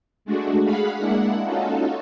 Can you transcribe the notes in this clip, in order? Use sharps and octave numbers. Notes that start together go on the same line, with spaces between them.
G#3 A3 D4 F#4
G#4 F5 F#5 B5
G#3 A#3 D4 E4 F#5
C#4 D#4 F4 F#4 A4